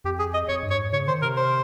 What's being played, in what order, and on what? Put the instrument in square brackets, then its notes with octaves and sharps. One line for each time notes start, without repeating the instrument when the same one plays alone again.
[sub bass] F2 [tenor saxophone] G4
[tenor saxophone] G#4
D#5
[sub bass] F2 [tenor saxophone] C#5
[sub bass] G2
[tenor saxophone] C#5
[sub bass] G#2
[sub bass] C#3 [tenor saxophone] C#5
[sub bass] D#3 [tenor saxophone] C5
[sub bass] C3 [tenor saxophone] A#4
[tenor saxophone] C5